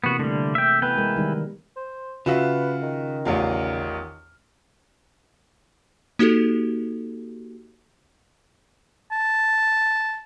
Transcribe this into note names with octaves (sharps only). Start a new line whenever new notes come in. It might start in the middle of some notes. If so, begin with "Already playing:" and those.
C3 E3 A#3 B3 F#4
D3 G3 A3
E5 G5
E3 B3 B4 G5
G#3 A#4
D#3 G3
C5
C#3 F4 F#4 B4 E5
D#3
A1 E2 F4
A#3 D#4 F#4 G4 A4
A5